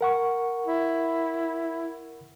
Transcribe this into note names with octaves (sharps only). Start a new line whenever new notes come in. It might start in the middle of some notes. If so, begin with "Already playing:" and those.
A#4 F#5 C#6
E4